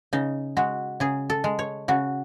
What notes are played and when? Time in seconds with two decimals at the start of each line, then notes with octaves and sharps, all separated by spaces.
0.13 C#3 D#4
0.57 G#3 F#4
1.00 C#3 G#4
1.30 A4
1.44 G#3
1.59 C#5
1.88 C#3 F#4